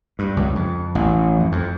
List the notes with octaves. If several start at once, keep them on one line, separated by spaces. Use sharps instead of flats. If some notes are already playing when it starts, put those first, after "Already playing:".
G2
C#2
F2
A1
F2
F2